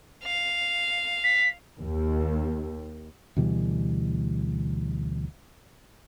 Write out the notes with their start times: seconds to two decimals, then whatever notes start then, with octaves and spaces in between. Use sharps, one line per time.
0.25 F5
1.24 B6
1.79 D#2
3.36 D2 B2 E3 G3